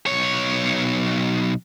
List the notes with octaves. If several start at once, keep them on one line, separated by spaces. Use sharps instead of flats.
B1 C#5